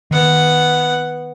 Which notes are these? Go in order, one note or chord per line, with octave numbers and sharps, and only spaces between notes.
D#3 B3 F#5